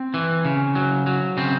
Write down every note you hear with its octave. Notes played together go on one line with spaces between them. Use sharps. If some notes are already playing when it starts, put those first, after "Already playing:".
Already playing: C4
E3
C#3
F#3
F#3
C#3 C4